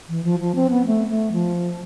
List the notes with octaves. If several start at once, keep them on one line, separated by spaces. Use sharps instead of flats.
E3
F3
F3
C4
B3
A3
A3
F3